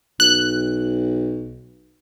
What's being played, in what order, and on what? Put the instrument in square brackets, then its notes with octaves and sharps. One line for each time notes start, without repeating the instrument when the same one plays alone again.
[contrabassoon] B1 [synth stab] F#6